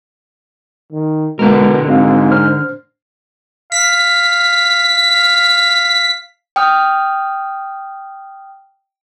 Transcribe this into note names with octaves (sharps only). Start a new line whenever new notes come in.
D#3
B2 D3 G#3 A#3 A#4
G#2 C4 F#4 F5
D4 C5 F6
F5 B6
G5 D#6 F6